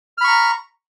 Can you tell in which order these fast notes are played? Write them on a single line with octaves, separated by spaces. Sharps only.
F6 B5 C#6 A#5